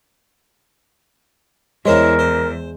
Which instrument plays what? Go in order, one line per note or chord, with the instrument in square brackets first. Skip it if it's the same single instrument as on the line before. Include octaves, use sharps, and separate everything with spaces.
[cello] E2 [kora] G#3 [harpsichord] E4 C5 C#5 [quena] A#4
[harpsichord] C5